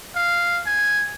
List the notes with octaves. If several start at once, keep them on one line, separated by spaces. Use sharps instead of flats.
F5
G#5